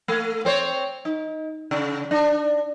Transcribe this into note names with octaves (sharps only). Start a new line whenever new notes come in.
A3
C4 C5 C#5
D#4
C#3
D4